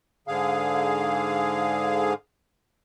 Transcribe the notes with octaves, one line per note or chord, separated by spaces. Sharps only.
G#2 D3 G#4 F5